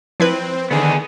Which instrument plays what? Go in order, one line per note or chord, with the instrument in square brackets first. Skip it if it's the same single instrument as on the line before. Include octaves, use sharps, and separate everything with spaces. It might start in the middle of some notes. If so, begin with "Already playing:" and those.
[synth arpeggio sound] F3 E4 B4 [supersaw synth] C4
[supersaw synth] D3 D#3 [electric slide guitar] B3 G#4